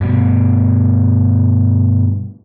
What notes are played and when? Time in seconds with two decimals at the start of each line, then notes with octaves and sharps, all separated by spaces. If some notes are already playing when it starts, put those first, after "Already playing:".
0.01 G2 B2